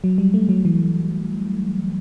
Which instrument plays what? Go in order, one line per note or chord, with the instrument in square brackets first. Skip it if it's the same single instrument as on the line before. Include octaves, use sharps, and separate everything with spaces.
[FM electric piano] F#3
G3
A3
F#3
E3